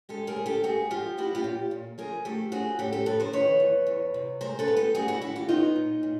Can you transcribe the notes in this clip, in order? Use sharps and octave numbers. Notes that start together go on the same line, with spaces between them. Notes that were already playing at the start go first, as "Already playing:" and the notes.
G#3 G4 A4
G#4 A#4
C4
G4 A4
G#2 F#4 G#4
F3 F4 G4
A#3 E4 F#4
F4 G4
A#2
A#2
F3 G#4 A#4
A3 G4 A4
C4 F#4 G#4
A2 G4 A4
G4 A4
F3 A4 B4
A#4 C5
D#3 B4 C#5
E2
E2
C3
G#3 A#4 C5
A4 B4
B3
G4 A4
G#2 F#4 G#4
E4 F#4
D#3 E4 F#4
F4 G4
B3 D#4 F4
A#2
A#2